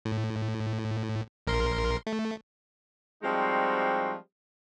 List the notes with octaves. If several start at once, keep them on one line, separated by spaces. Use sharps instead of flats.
A2
A#1 A#4 C6
A3
F3 G3 G#3 C4 D#4 F#4